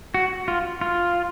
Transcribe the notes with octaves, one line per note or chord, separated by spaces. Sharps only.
F#4
F4
F4